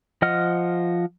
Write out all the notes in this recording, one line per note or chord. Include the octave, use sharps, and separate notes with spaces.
F3 D#5 F#5 F6